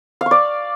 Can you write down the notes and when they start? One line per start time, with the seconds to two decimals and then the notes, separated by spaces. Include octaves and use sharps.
0.21 F5
0.26 C#6
0.31 D5